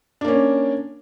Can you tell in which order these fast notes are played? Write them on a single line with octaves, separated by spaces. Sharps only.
D4 A#3 C#4